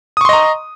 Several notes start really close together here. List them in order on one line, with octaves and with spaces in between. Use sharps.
D#6 C#6 C6 D#5 A#5